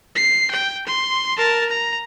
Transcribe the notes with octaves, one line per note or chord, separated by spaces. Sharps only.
C7
G5
C6
A#4 A5
A#5